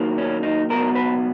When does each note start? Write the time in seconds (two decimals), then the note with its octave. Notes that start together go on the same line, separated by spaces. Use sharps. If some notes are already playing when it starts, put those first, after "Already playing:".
Already playing: D#2 D#3 F#3 A#3
0.18 C#4
0.43 D#4
0.70 C#2 B2 F#3 B3 A#4
0.95 B4